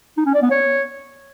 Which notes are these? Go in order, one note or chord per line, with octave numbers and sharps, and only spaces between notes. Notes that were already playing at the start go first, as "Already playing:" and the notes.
D#4
C#4
D5
B3
C#5